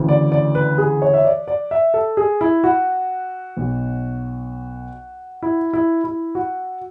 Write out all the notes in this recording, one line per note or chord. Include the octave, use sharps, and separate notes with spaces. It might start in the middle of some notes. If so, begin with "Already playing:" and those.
Already playing: D2 C#3 E3
D5
D5
B4
G#4
C#5
E5
D5
D5
E5
A4
G#4
E4
F#4
B1 B2 F#3
E4
E4
E4
F#4